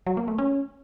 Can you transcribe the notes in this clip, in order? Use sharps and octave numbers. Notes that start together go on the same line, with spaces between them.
F#3
A#3
A3
C#4